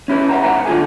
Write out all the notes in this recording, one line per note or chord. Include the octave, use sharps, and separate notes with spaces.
C#4 E4 G4 B4
B4 E5 F#5 G5 A#5
G#2 C4 F#5 G5 A#5
D3 F4 G4 A4 G#5